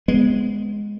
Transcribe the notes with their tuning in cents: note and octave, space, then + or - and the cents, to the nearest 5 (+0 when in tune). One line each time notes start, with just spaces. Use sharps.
G#3 +0 B3 +0